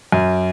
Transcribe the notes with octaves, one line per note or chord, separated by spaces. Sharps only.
F#2